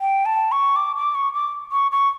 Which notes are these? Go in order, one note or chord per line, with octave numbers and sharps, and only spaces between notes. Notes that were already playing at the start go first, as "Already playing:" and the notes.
G5
A5
C#6
D6
D6
C#6
D6
C#6
C#6